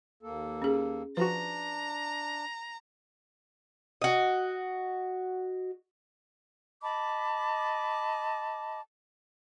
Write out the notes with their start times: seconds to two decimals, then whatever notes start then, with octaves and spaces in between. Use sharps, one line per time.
0.23 D#2 A#3 A4
0.62 C#4 G#4
1.17 F3 D4 F#4 B4 A#5
4.02 F#4 D#5
6.83 D#5 A5 B5 D6